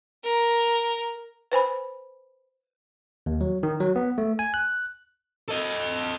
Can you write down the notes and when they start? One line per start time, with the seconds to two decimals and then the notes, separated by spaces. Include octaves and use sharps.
0.24 A#4
1.52 B4 C5 G#5 B5
3.26 D#2
3.41 F#3
3.63 D#3
3.80 F#3
3.96 B3
4.18 A3
4.39 G#5
4.54 F#6
5.48 A4 D#5